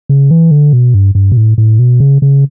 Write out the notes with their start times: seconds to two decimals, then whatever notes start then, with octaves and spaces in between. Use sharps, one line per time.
0.09 C#3
0.31 E3
0.51 D3
0.73 B2
0.94 G2
1.15 G2
1.32 B2
1.37 A2
1.58 A2
1.79 B2
2.00 C#3
2.22 C#3